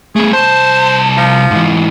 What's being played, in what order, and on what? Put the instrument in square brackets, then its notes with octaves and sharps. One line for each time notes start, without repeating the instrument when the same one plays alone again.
[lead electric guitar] A3 B3 [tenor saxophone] G#4
[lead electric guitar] C2 A5 [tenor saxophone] C5
[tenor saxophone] F3
[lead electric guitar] G#2 E3